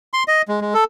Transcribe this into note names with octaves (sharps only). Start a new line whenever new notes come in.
C6
D#5
G#3
G#3
A4